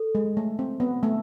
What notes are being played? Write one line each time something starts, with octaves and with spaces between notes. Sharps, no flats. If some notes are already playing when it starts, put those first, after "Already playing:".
Already playing: A4
G#3
A3
C4
B3
A3